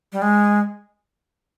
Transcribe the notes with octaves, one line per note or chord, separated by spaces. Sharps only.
G3
G#3